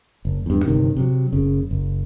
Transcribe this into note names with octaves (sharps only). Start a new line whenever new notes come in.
F#1
E2 G2
G1 D2 C3 D#3
C3 D#3 F#3
F#1 C#3
F#1